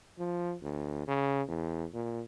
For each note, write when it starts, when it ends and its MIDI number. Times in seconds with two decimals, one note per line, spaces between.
0.19 0.54 53
0.62 1.02 38
1.07 1.42 49
1.48 1.85 40
1.93 2.21 46